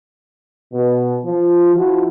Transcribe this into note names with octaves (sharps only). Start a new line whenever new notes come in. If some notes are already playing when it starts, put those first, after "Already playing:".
B2
F3
F3 E4 F#4